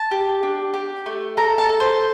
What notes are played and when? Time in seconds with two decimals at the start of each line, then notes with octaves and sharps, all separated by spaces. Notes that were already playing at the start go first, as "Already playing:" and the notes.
Already playing: A5
0.11 G4
0.43 D4
0.74 G4
1.06 A3
1.37 A4 A#5
1.58 A5
1.69 A4
1.80 C5